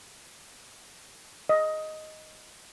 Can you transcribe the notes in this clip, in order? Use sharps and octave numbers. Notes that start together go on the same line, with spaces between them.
D#5